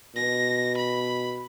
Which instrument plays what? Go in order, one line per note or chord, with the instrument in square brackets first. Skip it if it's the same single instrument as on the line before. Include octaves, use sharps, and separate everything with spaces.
[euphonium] B2 [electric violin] A#6
[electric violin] B5